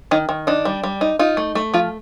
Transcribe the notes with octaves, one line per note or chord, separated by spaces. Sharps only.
D#3 D#4
D#3
D4 D#4
G3
G3
D#4
D#4 F4
A3
A3
F3 F4